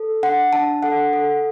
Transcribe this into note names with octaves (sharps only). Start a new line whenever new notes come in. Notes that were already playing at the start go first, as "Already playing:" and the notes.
Already playing: A4
D4 F#5
D4 A5
A4 F#5
A4